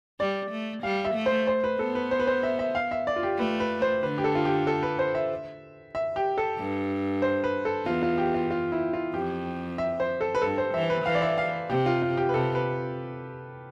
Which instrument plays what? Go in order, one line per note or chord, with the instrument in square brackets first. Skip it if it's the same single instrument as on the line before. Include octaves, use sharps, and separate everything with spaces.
[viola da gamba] G3 [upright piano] D5
[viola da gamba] A3
[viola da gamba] G3 [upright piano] F5
[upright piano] E5
[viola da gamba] A3
[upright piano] C5
C5
B4
[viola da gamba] B3 [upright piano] A4
[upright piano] B4
C5
B4
C5
E5
E5
F5
E5
D5
F4
G4
[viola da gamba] A3 [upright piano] B4
[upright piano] B4
C5
[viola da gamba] D3 [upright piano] B4
[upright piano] G4
A4
F4
G4
A4
B4
C5
E5
E5
G4
A4
[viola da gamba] G2
[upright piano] C5
B4
A4
[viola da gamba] E2 [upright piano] F4
[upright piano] F4
G4
F4
F4
E4
F4
[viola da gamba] F2 [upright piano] G4
[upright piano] E5
C5
A4
B4
[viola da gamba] G2 [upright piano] A4
[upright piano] C5
[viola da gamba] E3 [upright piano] E5
[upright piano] B4
[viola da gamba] E3 [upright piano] F5
[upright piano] D5
E5
F5
[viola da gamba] C3 [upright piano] G4
[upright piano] F4
F4
G4
B4
[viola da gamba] C3 [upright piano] A4
[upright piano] B4